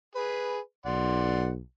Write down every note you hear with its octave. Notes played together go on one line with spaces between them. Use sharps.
G#4 B4
B1 D5 F#5 C6